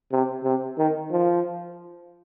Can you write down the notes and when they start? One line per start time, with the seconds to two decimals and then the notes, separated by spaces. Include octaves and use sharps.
0.12 C3
0.44 C3
0.78 D#3
1.11 F3